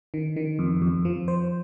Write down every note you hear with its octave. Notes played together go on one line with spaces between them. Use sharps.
D#3
D#3
F2
F2
F3
C5